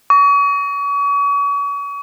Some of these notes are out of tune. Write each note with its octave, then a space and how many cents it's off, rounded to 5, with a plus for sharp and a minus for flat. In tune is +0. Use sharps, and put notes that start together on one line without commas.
C#6 +40